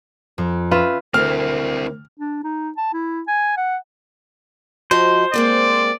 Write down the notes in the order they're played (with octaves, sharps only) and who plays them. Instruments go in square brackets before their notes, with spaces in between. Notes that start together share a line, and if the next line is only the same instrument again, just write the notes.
[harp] F2
[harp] C#4 E5 E7 [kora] F4 B4
[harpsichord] D2 [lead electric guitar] C4 E4 [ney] A#4 [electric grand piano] F6
[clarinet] D4
D#4
A5
E4
G#5
F#5
[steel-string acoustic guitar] F3 F#4 D#5 [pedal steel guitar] C5
[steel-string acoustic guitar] G#3 A#3 C4 [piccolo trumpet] D5